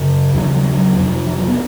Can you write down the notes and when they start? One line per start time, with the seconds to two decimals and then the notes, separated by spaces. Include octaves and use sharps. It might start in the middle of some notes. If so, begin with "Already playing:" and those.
Already playing: F#2 C#3
0.34 D#2 C#3 F#3
0.44 F3
0.54 F#3
0.64 G3
0.72 F#3
0.96 F2 C3
1.26 F3
1.37 F#3
1.48 B3